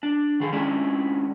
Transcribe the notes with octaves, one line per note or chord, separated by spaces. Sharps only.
D4
D#3 G#4 A4
G#3 C#4 D4 E4